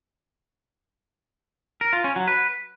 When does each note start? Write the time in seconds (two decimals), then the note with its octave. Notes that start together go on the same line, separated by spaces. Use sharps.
1.81 A#4
1.93 F4
2.04 C#4
2.16 F#3
2.27 B4